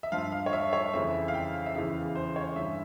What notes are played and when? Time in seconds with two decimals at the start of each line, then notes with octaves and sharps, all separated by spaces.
0.03 E5
0.12 G2 F3 F5
0.32 F5
0.46 C#5
0.53 E5
0.73 C#5
0.93 F2 C#3 E3 E5
1.28 F5
1.34 G5
1.66 E5
1.75 E2 C#3 E3 F5
2.15 C5
2.36 C#5
2.56 G2 E3 E5